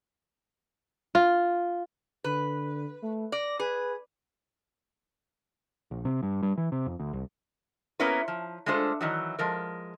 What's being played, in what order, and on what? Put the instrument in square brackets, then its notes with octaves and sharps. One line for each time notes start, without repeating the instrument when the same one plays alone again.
[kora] F4
[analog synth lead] D3 [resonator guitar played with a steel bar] B4
[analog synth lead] A3
[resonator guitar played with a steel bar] D5 [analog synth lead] A#6
[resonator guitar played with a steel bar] G#4 [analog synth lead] B4
[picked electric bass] A#1
C3
G2
G2
E3
C3
F2
D2
C2
[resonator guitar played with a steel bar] A#3 B3 C#4 E4 A#4 B4
F3
G#3 A3 D4 F4 C5
D#3 E3 F#3
F3 G#3 A#4